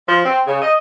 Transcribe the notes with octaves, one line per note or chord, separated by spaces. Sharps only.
F3
C4
C#3
D#5